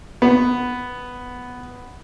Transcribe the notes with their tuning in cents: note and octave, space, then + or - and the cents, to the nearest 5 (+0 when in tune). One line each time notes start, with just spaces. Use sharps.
B3 +5